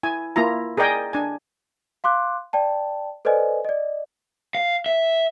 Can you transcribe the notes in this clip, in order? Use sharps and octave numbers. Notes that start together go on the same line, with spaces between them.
E4 G#5
A#3 E4 F4 A#5
G#4 A#4 D5 D#5 G5 G#5
D4 G#5
F5 C6 D6 F#6
D5 G5 A5
A4 B4 C5 D5 D#5 G#5
D5 D#5
F5
E5